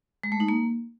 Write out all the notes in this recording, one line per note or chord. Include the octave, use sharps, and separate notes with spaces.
G#3
A3
D#4
A#3